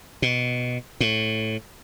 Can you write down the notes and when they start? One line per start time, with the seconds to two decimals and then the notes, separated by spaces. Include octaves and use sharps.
0.22 B2
1.00 A2